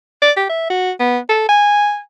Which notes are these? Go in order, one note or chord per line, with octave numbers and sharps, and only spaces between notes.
D5
G4
E5
F#4
B3
A4
G#5